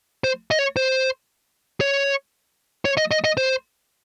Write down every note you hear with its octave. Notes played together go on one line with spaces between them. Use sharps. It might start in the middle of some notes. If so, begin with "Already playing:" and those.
C5
D#5
C#5
C5
C#5
C#5
D#5
D#5
D#5
C5